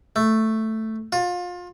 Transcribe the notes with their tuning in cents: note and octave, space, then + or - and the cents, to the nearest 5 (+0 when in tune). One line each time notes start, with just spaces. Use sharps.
A3 +5
F4 +30